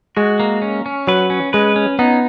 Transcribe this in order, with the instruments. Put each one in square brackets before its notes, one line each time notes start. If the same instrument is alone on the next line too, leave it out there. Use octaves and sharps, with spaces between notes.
[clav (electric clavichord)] G#3 [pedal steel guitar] F#4
[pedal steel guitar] A#3
C#4
C#4
[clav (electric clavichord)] F#3 [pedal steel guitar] B4
[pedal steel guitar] C#4
[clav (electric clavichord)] G#3 [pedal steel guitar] B4
[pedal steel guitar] C#4
[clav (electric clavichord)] B3 [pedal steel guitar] D#4